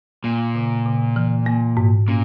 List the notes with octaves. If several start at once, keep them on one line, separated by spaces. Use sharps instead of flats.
A#2 A#3
C#3
C#3
E3
A#3
G#2
A#2 C#4